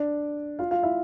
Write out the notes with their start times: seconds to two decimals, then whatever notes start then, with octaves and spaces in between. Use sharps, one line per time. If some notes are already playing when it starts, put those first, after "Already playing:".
Already playing: D4 D5
0.59 F4 F5
0.71 F4 F5
0.83 E4 E5